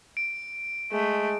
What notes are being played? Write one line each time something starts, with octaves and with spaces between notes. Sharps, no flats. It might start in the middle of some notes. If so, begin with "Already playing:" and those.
D7
G#3 A3